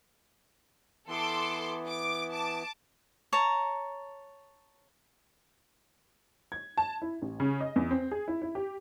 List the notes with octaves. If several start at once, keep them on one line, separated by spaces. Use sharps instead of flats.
E3 B3 A4 C6 D6
D6
A5 D6
C#5 A5 A#5
G#6
A5
E4
A1
C#3
D#5
E2
C4
G#4
E4
E4
G4